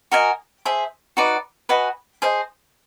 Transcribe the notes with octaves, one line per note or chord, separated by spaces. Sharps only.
F#4 A#4 D#5 G#5
G#4 C5 E5
D#4 F#4 B4 D5
F#4 B4 D#5 G#5
G#4 C5 D#5